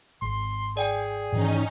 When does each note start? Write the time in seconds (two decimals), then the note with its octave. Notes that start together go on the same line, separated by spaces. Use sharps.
0.22 G#1 C6
0.77 G#4 D5 G5 G#5
1.32 G#2 D#3 E3 C#4 D#4